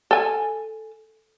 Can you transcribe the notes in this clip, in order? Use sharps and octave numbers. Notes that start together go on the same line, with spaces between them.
A4 G#5